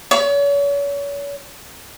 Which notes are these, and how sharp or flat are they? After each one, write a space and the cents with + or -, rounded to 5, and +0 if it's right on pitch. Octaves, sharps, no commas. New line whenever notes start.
C#5 +40